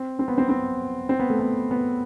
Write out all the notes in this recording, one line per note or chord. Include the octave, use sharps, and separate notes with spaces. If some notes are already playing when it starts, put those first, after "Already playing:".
Already playing: C4
C4
B3
C4
C4
C4
B3
A3
B3
B3